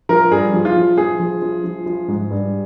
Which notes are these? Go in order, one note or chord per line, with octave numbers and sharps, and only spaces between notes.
F3 A#4
G2 G#4
F3
F4
F3
F3 G#4
F3
F3
F3
F3
G#2
G2